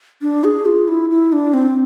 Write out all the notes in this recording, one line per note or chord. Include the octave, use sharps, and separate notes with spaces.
D4
G#4
F4
E4
E4
D4
C4